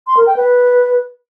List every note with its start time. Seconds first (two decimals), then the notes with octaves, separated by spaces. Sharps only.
0.07 C6
0.17 A#4
0.27 G5
0.36 B4